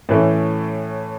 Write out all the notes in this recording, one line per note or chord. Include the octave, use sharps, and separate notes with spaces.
A2 E3 A3 C#4